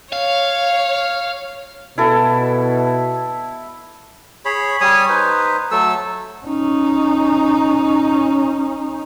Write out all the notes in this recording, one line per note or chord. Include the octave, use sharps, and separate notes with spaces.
C#5 F5
B2 E4 A4
G#4 C#5 B5
G3 C#5 G#5 D#6
D#4 B4 C5
F#3 A3 A4 E6
C#4 D#4